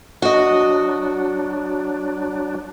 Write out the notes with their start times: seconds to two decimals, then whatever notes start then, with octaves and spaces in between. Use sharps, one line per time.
0.22 F#3 D4 F#4 D#5